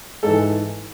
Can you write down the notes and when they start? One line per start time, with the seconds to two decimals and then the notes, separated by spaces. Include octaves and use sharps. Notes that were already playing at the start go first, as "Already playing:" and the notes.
0.23 G#2 E3 A4